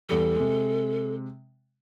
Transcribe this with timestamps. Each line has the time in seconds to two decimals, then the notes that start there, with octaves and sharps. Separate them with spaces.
0.09 E2 G3 A4
0.36 C3 G#3